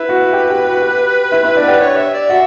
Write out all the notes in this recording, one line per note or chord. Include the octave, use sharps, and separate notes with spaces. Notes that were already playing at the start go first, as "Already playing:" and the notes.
Already playing: E4 B4 E5
F#4 F#5
G4 G5
G4 G5
F#4 F#5
G4 G5
E4 E5
E4 E5
D4 D5
F#5
G4 G5
C#5
E5
D5
F#4 E5 F#5